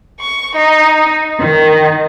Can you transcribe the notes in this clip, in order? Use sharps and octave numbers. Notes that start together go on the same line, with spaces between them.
C#6
D#4
D#3